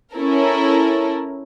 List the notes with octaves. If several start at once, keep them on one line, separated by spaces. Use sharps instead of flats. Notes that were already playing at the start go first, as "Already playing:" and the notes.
C#4 E4 A4 A#4